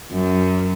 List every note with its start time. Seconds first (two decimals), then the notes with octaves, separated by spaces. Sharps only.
0.12 F#2